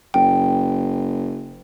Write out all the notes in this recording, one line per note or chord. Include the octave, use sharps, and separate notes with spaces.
F#1 G5